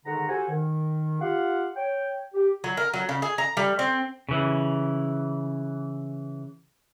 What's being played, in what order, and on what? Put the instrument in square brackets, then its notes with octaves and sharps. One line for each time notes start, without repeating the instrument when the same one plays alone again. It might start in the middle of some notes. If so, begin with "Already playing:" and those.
[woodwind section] G#2 D3 D#3 F#5 A#5
F#4 G4 A4 C5 F#5 G#5
D#3
F4 G4 F5 F#5
C#5 G5
G4
[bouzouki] F#3
A#4
F#3
C#3
G#4
A#5
G3
C4
[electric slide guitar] C#3 E3